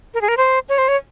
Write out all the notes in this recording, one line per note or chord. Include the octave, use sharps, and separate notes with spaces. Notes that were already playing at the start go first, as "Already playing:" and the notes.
A#4
G#4
A#4
C5
C#5
C5
C#5